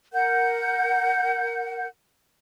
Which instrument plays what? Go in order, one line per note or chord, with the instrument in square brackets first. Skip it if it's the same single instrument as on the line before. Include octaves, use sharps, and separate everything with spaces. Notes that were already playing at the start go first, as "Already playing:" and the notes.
[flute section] A#4 F#5 G6